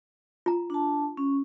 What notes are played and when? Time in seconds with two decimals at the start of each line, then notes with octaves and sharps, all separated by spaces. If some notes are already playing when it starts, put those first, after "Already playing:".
0.46 F4 A#5
0.70 D4 A5
1.17 C#4